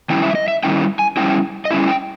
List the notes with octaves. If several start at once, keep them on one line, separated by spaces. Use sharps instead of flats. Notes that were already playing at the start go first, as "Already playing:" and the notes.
D#3 G3 C#4 E4 G5
E5
D#5
E5
D#3 G3 C#4 E4 G5
G#5
G3 C#4 E4 G5
D#5
G3 C#4 E4 E5
G5